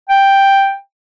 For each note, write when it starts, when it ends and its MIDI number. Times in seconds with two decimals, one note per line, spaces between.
0.10 0.74 79